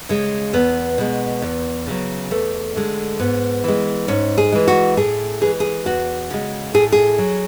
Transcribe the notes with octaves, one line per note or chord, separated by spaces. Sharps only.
C#3 G#3
E2 B3
B2 G#3
E2
C#3 F#3
E2 A3
D3 G#3
G#2 B3
E3 G#3
G#2 C#4
G#4
E3 G#3
F#4
A2 G#4
E3 G#3 G#4
G#4
E2 F#4
C#3 G#3
A2 G#4
G#4
F#3